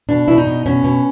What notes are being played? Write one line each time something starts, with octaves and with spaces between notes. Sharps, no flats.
B2 D4
B2 E4
D#4
B2
B2 C#4
B2